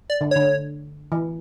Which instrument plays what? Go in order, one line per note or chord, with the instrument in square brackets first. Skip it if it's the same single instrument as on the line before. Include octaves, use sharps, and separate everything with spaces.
[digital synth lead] D5
[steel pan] D3
[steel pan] D3 [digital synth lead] C#5
[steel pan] E3